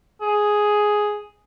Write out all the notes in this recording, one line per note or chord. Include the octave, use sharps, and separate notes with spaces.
G#4